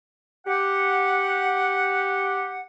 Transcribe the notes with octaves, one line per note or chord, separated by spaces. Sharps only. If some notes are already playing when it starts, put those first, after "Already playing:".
G4 F#5